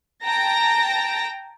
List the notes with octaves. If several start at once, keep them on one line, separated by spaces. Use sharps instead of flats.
G5 A5 A#5 A#6